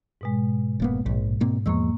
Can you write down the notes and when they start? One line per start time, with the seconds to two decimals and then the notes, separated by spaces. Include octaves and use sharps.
0.21 G#2 B2 G#3
0.80 F1 A#3 B3
1.06 A#1 G#2
1.40 B2 A#3 C4
1.66 E2 F3 G#3 A#3 C#6 E6